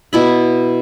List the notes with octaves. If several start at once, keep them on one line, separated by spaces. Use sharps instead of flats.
B2 E4 B5